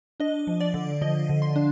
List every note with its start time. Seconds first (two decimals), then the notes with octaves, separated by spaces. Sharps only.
0.20 D4 D#5
0.47 F3
0.61 D5
0.74 D3
1.01 F3 D#5
1.29 D3
1.42 C6
1.56 D4